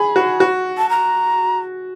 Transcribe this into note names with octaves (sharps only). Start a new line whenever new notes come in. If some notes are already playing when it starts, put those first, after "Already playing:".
Already playing: G#4 B5
F#4
F#4
A5
A#5